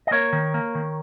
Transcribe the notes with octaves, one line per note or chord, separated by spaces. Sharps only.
D#5
A#3 A#4 C#5
D#3
A#3
D#3